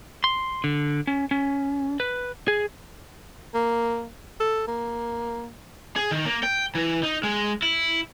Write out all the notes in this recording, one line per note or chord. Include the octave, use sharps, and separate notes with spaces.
C6
D3
C#4
C#4
B4
G#4
A#3
A4
A#3
G#4
D#3
A#3
G5
E3
D#4
G#3
E4